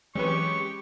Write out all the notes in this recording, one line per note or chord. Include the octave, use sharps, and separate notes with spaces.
E3 F#3 G#3 C4 C#4 G4 B4 C#6